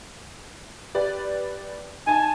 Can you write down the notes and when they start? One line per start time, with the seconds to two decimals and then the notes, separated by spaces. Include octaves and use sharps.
0.95 G4 B4 D5
2.07 D#4 G#5 A5